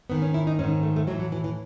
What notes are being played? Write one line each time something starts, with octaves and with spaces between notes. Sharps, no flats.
G#2 D#3 B3
C#4
E4
D#4
G#2 D#3 C#4
A3
A3
A2 E3 F#3
F#3
E3
E3